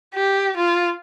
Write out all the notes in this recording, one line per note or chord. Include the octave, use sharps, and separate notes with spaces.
G4
F4